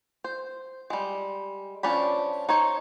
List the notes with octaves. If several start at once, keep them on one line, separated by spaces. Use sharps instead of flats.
C5
G3 G#3
F3 C#4 D4 C#5 B5
D#4 C5 C#5